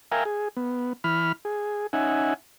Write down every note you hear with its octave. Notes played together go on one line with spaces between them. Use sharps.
A#4 E5 F5 G5 G#5 A#5
G#4
B3
E3 B5 F6
G#4
C#4 D#4 E5 F#5 G#5